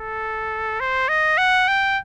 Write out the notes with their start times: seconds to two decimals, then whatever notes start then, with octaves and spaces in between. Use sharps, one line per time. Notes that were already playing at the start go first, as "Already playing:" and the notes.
Already playing: A4
0.80 C5
1.09 D#5
1.38 F#5
1.68 G5